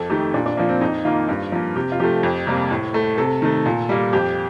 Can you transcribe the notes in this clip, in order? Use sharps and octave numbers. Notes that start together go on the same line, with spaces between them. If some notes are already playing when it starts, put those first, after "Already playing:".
Already playing: F2 A4
D#3 A3 G4
A#2 D4
D4
F3 A#3
C4
F2 D#4
D#3 A#3 F4
G2
F3 A#3
C3 G4
F4
F3 A3 G4
F2
C3 G3 A#3
A2
A3
C3 A4
D#3 A3
A#2
G3 A#3
F2 G4